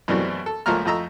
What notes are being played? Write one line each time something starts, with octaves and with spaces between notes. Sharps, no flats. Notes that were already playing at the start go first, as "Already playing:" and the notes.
F#2 B2 E3 G3 A3 C4
A4
C#2 F3 A3 A#3 A#5 F6
F2 F3 A3 D#5 A#5 E6